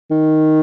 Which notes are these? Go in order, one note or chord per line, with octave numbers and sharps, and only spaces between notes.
D#3